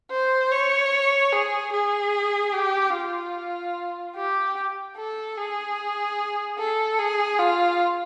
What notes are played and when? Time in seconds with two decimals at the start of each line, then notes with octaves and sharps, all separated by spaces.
0.11 C5
0.52 C#5
1.33 G#4
1.73 G#4
2.54 G4
2.94 F4
4.16 G4
4.97 A4
5.38 G#4
6.59 A4
6.99 G#4
7.39 F4